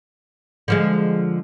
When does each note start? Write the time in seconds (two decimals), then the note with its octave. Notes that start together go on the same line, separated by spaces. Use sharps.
0.68 D3 F3 G#3